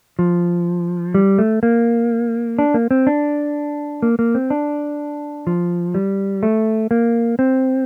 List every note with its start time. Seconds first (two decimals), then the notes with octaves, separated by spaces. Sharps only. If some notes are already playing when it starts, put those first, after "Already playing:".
0.19 F3
1.15 G3
1.38 A3
1.63 A#3
2.59 D4
2.74 A#3
2.91 C4
3.07 D4
4.03 A#3
4.19 A#3
4.35 C4
4.50 D4
5.47 F3
5.95 G3
6.43 A3
6.91 A#3
7.39 C4